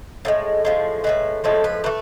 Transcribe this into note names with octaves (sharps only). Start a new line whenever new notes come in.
A2 F3 G#3
A2 F3 G#3
A2 F3 G#3 B4
A2 F3 G#3 A4
B4
E3 A3 B4